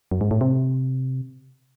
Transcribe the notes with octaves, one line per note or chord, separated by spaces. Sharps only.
F#2
G#2
A2
C3